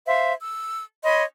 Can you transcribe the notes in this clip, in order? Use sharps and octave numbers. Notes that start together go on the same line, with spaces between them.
C5 E5 F5
E6
C#5 D#5 B5 C6